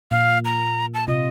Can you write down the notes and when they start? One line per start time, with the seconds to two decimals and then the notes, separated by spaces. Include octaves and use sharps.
0.11 A#2 F5
0.45 A#5
0.94 A5
1.08 C3 F4 D#5